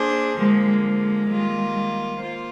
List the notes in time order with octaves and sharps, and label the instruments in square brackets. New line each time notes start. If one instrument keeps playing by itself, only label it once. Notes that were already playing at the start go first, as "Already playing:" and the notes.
Already playing: [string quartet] A#3 D4 G#4 C5
[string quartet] D3 F3 A#3 [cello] G#3
[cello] G#3
[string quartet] D#3 G3 A#3 F4
A#3 F4 C5